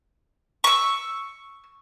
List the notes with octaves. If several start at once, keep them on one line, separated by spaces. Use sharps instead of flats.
C#6 E6